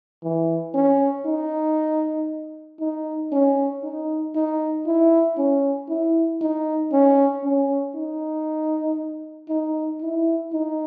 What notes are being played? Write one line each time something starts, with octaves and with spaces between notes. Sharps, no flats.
E3
C#4
D#4
D#4
C#4
D#4
D#4
E4
C#4
E4
D#4
C#4
C#4
D#4
D#4
E4
D#4